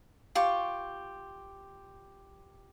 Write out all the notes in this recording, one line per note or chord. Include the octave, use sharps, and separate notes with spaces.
F4 G4 C#6